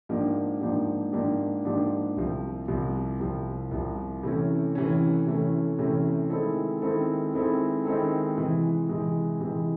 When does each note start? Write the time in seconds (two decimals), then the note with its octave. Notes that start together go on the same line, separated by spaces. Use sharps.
0.09 G#2 F3 A#3 D4 G4
0.61 G#2 F3 A#3 D4 G4
1.13 G#2 F3 A#3 D4 G4
1.65 G#2 F3 A#3 D4 G4
2.16 C2 C3 F3
2.68 C2 C3 F3
3.20 C2 C3 F3
3.71 C2 C3 F3
4.23 C3 E3 A3 C#4
4.75 C3 E3 A3 C#4
5.26 C3 E3 A3 C#4
5.79 C3 E3 A3 C#4
6.30 D#3 G#3 C4 E4 A4
6.82 D#3 G#3 C4 E4 A4
7.34 D#3 G#3 C4 E4 A4
7.85 D#3 G#3 C4 E4 A4
8.38 C3 E3 G#3
8.89 C3 E3 G#3
9.40 C3 E3 G#3